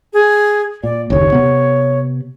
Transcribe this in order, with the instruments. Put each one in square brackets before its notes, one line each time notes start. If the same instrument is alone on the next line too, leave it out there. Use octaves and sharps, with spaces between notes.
[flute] G#4
[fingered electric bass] A#2 [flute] D5
[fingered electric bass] F#1 D#2 [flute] C#5
[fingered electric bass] C3 B3